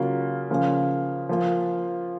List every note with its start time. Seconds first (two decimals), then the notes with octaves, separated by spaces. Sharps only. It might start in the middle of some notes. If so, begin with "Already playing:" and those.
Already playing: C#3 F#3 A#3 F4
0.50 C#3 F3 A#3
1.29 F3 A#3 F4